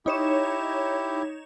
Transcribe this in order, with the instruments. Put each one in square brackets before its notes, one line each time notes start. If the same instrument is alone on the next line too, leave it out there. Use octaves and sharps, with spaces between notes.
[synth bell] D#4 C#5 E7 [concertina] E4 G4